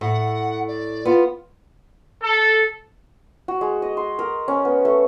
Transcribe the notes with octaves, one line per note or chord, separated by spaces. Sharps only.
A2 F#5
D5
B3 F4
A4
F#4
G#3
D#5
C6
A#4
C#4
B3
A3